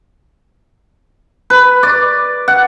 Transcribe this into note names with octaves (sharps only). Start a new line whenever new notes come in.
B4
D5
F#5